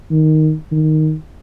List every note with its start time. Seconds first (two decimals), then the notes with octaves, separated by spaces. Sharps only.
0.10 D#3
0.71 D#3